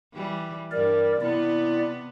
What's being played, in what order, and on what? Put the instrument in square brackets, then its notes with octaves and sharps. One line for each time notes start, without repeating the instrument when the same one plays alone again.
[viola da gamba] E3 G3
[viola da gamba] G2 G3 [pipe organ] A#4 D5
[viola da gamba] C3 B3 [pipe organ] E4 D5